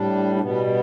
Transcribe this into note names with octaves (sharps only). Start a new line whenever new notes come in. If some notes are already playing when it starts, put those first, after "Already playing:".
Already playing: A2 G3 D4
D4
B2 G3 B3
B3